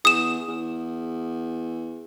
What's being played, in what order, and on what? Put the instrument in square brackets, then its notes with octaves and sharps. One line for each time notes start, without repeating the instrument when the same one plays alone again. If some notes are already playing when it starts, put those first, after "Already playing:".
[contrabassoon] E2 [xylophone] D#6 E7
[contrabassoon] E2